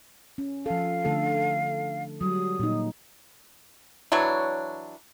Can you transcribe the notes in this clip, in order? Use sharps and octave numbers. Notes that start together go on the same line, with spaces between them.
C#4
F3 A4 F5
D3 A3 A4
F#3 G3 D#6
A#2 D#4
E3 F#3 D4 C#5